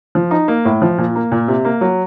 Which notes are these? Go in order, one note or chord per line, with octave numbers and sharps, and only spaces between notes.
F3
D#4
A#3
A2
F3
A#2
A#3
A#2
C3
A#3
F#3